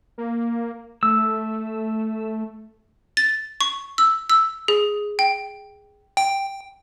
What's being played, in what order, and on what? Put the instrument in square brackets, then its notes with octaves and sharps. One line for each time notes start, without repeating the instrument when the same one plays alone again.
[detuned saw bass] A#3
[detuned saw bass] A3 [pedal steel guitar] E6
[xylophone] A6
C#6
E6
E6
G#4
G5
[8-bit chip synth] G5